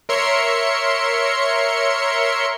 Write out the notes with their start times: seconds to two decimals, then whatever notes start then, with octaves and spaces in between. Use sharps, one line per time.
0.09 A#4 C#5 E5 C6 C#7